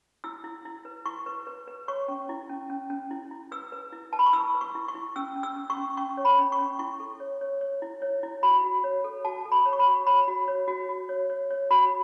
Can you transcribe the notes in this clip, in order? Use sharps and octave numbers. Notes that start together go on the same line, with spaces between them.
E4 E6
E4
E4
B4
E4 C#6
B4
B4
B4
C#5 C#6
C#4
E4
C#4
C#4
C#4
E4
E4
B4 E6
B4
E4
B4 A5
B5
C#6
E4 E6
B4
C#6
E4
C#6
E4
C#4 E6
C#4
E6
C#4
C#6
C#4
C#4 C#6
C#5
B5
C#4
C#6
C#4
E4 C#6
A4
C#5
C#5
C#5
E4
C#5
E4
F#4 B5
F#4
C#5
A4
F#4 A5
A4
B5
C#5
C#6
B5
F#4
C#5 B5
F#4
C#5
F#4
F#4
C#5
C#5
C#5
F#4 B5